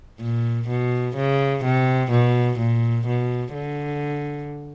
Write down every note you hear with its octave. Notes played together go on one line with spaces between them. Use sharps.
A#2
B2
C#3
C3
B2
A#2
B2
D3